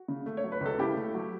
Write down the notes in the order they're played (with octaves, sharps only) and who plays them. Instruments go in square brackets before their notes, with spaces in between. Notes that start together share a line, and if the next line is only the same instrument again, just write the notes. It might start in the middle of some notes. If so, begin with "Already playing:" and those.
Already playing: [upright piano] F#4
C#3
A3
C#5
F#3
B4
C#2
A4
C#3 E4 G4
A3
F#3